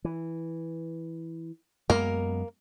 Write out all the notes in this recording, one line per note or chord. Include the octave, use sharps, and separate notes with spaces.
E3
F#2 G#3 A#3 B3 A#4